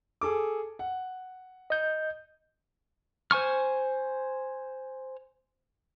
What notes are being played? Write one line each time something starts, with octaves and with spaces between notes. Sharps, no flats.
G#4 A4 D6
F#5
D#5 G6
C5 G#5 C#6 F6